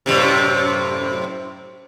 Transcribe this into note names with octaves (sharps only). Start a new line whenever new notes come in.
F#2 A2 C3